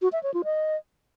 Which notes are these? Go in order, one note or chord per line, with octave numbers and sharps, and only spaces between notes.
F#4
E5
C#5
F4
D#5